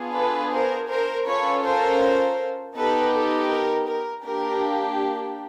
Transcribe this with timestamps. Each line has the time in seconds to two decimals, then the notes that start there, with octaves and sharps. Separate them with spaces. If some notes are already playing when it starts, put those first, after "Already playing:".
Already playing: B3 D4 F4 G#4
0.15 A4 B4
0.53 A#4 C5
0.90 A#4 C5
1.27 C#4 F4 A4 B4 C#5
1.64 A#4 C5
2.76 B3 D#4 G4 A4 B4
3.13 A4
3.50 A#4
3.88 A#4
4.24 A#3 D4 G4 A#4